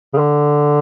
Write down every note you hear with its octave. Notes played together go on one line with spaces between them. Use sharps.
C#3
D3